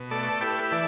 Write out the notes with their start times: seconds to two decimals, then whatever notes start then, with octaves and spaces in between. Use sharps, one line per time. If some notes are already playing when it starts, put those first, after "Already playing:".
Already playing: B2
0.11 A3 A4 D5
0.41 E4 G4 B4
0.72 E3 A4 D5